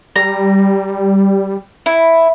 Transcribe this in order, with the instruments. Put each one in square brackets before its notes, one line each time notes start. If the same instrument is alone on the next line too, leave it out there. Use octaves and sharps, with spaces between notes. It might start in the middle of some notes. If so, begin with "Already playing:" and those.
[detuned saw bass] G3 [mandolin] A#5
[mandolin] E4